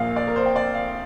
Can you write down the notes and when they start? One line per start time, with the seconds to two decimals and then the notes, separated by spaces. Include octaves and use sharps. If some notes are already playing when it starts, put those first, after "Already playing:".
Already playing: A#1 A#2 A#3 F5
0.16 D5
0.27 A#4
0.36 C5
0.46 G5
0.56 D5
0.75 F5